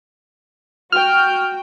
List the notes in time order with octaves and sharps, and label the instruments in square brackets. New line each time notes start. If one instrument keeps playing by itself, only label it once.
[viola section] F#4 G5 [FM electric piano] F6